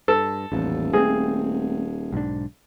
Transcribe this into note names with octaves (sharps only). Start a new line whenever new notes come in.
G2 A4
D#1 A1 E2
G2 A3 C4 G#4
B1 G#2 D4